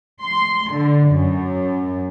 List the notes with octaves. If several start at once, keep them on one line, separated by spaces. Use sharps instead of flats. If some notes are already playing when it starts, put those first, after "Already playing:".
C6
D3
F#2